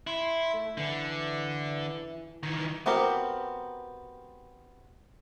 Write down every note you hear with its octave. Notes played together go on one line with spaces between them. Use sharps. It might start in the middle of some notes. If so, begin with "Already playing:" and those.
E4 C6
A3
D3 E3
D#3 E3
B3 C4 F#4 G4 A#4